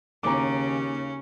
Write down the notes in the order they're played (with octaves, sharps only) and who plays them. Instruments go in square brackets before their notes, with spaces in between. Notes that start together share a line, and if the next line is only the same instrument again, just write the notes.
[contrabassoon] D#2 [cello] C#3 [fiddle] C#4 [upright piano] A#5 D6